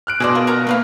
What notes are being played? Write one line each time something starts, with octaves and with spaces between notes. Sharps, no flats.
F6 F#6 D7
B2 G#4 C5 D5 C6
F4 A#4
A#4 C#5 A#5
A3 A#3 B4 F5